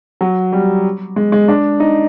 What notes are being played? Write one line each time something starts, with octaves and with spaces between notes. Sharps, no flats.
F#3
G3
G#3
G#3
D4
D#4